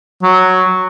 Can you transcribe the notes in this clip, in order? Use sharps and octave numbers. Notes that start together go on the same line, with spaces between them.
F#3